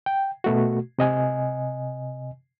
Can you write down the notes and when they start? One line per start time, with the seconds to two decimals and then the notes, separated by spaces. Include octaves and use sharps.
0.06 G5
0.44 B2 A3 F#4
0.99 C3 D#5 G#5